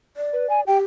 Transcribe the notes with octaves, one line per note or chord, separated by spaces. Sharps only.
D5
B4
G#5
G4 G5